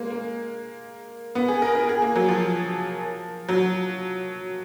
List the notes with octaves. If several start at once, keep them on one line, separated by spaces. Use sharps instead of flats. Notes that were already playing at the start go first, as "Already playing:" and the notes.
Already playing: G#3 A#3
A#3
B3
G#4
A#4
A#4
G#4
A#3
F#3
F3
F#3